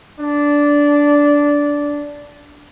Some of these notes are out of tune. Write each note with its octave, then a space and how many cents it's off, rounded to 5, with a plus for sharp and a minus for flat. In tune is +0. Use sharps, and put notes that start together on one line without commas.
D4 -15